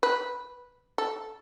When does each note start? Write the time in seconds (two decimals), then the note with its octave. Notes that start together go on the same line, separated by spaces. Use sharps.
0.03 B4
0.98 A4